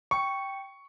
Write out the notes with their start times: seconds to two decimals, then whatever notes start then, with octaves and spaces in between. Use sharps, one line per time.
0.11 G5 C#6 C#7